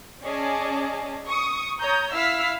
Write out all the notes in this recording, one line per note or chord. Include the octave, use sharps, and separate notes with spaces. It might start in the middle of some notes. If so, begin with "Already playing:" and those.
C#4 G#4 D5 D#5 A5
C#6 D#6
C#5 A#5 D#6 G6
E4 F5 E6 F6 B6